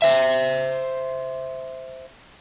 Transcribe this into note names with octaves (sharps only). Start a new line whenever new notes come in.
C5 E5